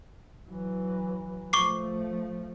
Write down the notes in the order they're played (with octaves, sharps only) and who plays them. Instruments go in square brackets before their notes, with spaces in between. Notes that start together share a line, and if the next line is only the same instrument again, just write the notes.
[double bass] E3 F#3
[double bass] F3 A3 [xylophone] C#6 D6 C7